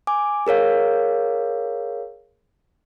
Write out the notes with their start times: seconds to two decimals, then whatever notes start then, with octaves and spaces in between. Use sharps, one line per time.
0.07 G#5 D6
0.47 G#4 A#4 C#5 F5